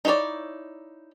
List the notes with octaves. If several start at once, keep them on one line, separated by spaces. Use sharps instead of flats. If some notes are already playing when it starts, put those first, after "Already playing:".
D#4 E4 B4 C#5 D5